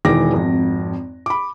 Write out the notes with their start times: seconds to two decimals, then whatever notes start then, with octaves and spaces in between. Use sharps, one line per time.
0.05 E1 D#3 E3 D6 A#6
0.33 G#1 F2
1.26 B5 D6